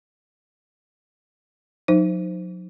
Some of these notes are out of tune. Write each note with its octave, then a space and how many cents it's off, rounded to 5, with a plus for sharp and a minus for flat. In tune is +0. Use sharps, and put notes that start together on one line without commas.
F#3 -40 D#4 +0 C5 -10